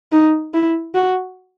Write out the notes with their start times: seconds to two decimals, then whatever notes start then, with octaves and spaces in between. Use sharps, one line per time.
0.12 D#4
0.54 E4
0.95 F#4